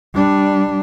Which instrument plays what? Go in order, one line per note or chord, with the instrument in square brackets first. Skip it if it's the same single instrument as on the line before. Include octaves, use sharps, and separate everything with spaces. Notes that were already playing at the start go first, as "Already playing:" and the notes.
[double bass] G3 D4